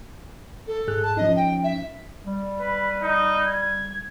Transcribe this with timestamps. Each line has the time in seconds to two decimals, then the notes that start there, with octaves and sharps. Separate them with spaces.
0.67 A4
0.88 G#2 G#4 F#6
1.02 A5
1.17 F3 C#4 D#4 D#5
1.36 G5
1.64 E5
2.26 G3
2.60 B4
3.02 D#4
3.47 G#6